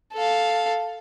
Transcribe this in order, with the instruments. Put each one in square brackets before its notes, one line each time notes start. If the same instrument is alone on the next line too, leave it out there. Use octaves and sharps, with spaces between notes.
[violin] A4 F5